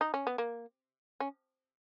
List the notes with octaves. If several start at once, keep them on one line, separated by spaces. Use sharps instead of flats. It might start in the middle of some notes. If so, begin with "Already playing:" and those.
D#4
C#4
B3
A#3
C#4